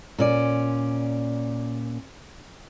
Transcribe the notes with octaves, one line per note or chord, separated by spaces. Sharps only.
A#2 C#4 D5